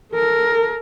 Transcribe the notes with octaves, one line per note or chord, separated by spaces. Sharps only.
A4 A#4